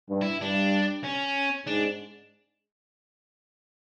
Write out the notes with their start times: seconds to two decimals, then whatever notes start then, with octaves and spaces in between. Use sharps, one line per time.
0.10 G2
0.21 E4
0.41 G2 D4
1.05 C#4
1.67 G#2 D4